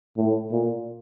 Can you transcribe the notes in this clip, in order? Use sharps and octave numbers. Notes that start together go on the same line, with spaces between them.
A2
A#2